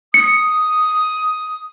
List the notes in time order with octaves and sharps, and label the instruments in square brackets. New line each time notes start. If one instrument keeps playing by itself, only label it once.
[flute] D#6 [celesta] C#7